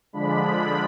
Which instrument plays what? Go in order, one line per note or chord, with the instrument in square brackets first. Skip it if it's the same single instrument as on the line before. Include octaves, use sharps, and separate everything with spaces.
[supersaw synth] D3 F3 G#3 D4 B5